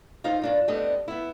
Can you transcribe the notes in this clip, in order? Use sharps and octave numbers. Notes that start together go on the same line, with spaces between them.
D#4 F4 C5 F5
G2 D4 F4
G3 A3 B3 C4 D4 D#5
B3 E4